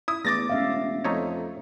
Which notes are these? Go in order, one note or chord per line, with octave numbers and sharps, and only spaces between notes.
E4 D#6
E2 A3 D6 A6 A#6
E1 C#4 E5 F5
F2 A3 D#4 C#5